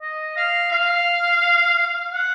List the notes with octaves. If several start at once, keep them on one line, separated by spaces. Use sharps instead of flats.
D#5
F5
F5
F#5